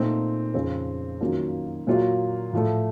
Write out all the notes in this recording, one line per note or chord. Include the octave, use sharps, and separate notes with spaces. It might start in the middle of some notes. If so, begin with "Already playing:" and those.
Already playing: A#2 A3 C4 D#4
F2 C#3 F3 C4
F#2 D#3 F#3 A#3 F4
A#2 F#3 A#3 F4
A2 F3 A3